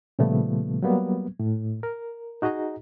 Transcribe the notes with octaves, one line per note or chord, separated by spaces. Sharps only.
A#2 C#3 F3 G3 A3 B3
F#3 G3 A#3 B3
A2
A#4
D#4 F#4 G#4 D#5 A#5